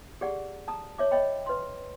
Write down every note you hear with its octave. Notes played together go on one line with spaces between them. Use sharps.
G4 G#4 D5 F#5
A5 A#5 D#6
C#5 E5 D6
C#5 D#5 G5 B5
B4 C6